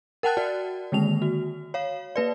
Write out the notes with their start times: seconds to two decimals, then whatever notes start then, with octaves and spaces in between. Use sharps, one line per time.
0.23 A#4 F#5 G5 A5 F#6 A6
0.37 F#4 D5
0.92 D3 D#3 G#3 A#3 F7
1.22 F#4
1.74 C#5 F5
2.16 A#3 B4 D5